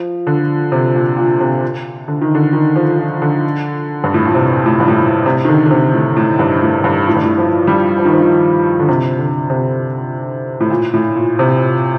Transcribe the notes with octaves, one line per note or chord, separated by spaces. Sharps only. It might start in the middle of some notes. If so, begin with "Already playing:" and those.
Already playing: F3
D3
C3
A#2
A#2
C3
D3
D#3
D3
D#3
F3
F3
D3
G2
A2
A#2
C3
A2
G2
A2
A#2
C3
D#3
D3
D3
C3
A2
A2
G2
A2
G2
A2
G2
A2
F3
G3
F3
D#3
F3
D#3
D3
C3
D3
C3
A2
A#2
A2
A#2
C3